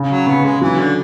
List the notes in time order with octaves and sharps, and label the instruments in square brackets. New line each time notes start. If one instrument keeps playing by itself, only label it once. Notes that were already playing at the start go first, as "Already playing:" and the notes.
Already playing: [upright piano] C#3
[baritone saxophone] F#3
[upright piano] C#3 [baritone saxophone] B3
[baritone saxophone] G#3
[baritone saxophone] E3 [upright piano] F#3
[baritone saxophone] D3